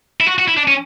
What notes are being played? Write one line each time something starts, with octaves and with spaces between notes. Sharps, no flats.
E4
F#4
F#4
E4
D4
C#4